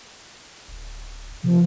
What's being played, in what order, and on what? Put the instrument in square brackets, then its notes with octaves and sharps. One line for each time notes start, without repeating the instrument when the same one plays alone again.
[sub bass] D1
[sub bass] C3 [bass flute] F3